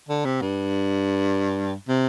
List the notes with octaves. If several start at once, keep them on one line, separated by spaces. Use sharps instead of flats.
D3
C3
G2
C3